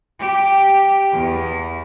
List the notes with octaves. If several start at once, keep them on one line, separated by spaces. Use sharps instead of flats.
G4
E2